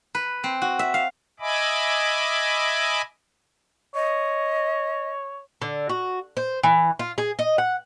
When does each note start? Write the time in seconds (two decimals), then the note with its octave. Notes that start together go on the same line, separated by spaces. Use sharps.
0.15 B4
0.44 C4
0.62 F#4
0.79 E5
0.94 F5
1.40 D#5 E5 G#5 B5 D6
3.95 C#5 D#5
5.62 D3
5.89 F#4
6.37 C5
6.63 E3
6.99 F4
7.18 G#4
7.39 D#5
7.58 F#5